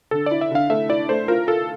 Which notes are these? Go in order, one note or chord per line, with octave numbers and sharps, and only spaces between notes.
D3 A4
E4 D5
E5
D3 F5
A3 E5
E4 D5
A3 C5
F4 A#4
F4 A4